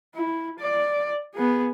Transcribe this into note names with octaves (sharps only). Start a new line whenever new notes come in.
E4
D5
B3 G#4